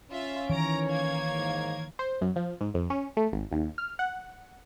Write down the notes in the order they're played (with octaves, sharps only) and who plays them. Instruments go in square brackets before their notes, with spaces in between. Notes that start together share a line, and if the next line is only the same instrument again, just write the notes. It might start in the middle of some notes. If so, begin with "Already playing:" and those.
[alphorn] C#4 [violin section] F4 E5
[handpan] D#3 E3 [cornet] C#5 [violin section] A#5 D7
[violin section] A#3 G#6
[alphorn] G#2
[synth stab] C5
F#2
F3
G#2
F2
C#4
A3
G#1
D#2
F6
F#5